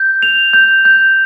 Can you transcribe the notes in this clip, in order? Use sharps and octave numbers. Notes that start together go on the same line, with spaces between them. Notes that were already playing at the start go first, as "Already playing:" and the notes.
Already playing: G6
F7
G6
G6